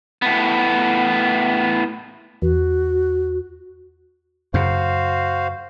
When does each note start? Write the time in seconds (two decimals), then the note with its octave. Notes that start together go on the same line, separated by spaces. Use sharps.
0.22 A2 B3
2.42 E2 F#4
4.54 F#2 C#3 F#4 C5 F5